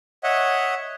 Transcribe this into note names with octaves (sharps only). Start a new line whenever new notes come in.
C#5 D#5 E5 F#5